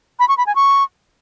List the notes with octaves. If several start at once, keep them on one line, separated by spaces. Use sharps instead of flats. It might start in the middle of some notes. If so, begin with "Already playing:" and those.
B5
C#6
B5
G#5
C#6